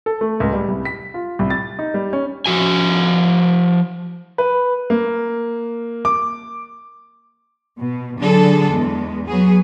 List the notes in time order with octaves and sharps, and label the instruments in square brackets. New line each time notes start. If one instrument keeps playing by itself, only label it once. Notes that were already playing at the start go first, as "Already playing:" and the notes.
[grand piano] A4
A3
C#2
G3
C2
B6
F4
C2
A6
D#4
G3
C#4
[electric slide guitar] F3 F#4 G#5
[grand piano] B4
A#3
D6
[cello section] B2
D3 F#3 D4 G#4 A4
E2 G#3
F#3 B3 G#4